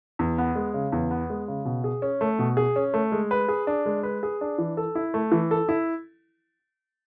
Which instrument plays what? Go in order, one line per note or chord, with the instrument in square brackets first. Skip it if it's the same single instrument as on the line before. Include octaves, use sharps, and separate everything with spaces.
[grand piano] E2
B3
G#3
C#3
E2
B3
G#3
C#3
B2
G#4
C#4
A3
B2
G#4
C#4
A3
G#3
B4
G#4
D4
G#3
B4
G#4
D4
E3
A4
E4
A3
E3
A4
E4